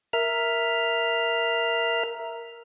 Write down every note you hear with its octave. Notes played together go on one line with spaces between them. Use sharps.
A#4 E5 F6